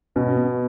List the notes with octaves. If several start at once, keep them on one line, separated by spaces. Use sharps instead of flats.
B2 C#4
B3